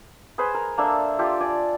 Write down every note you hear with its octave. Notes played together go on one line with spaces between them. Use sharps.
G#4 B4 C5 G#5
A#4
A#3 D4 A4 E5
F4 G4 A4
D5 G#5